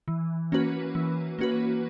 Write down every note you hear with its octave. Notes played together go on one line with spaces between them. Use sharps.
E3
A#3 C#4 F#4 B4
E3
A#3 C#4 F#4 B4